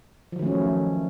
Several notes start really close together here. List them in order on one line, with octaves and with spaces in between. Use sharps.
F3 F#3 D#3 A3 C#4